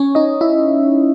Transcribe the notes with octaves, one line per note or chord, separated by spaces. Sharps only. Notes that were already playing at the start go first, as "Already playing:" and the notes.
Already playing: C#4 C#5
D#4 D#5
E4 E5